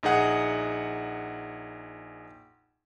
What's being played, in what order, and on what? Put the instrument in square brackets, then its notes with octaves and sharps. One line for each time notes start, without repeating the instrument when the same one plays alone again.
[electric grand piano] A#1 D#4 G#4 F#5